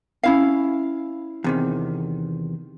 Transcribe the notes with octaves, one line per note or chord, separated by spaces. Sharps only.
C#4 E4 F5
E2 C3 D#3